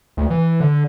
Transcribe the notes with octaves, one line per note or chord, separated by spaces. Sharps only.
D2
E3
D3